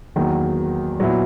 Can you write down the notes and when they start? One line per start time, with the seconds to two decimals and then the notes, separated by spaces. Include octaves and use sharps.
0.16 E2 D#3 F#3 A#3
0.99 A#2 F#3 B3 E4